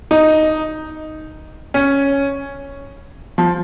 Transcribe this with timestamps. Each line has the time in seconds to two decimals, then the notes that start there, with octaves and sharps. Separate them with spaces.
0.11 D#4
1.74 C#4
3.38 F3